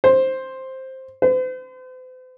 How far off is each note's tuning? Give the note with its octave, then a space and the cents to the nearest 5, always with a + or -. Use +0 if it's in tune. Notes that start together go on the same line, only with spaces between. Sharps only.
C5 +5
C5 -45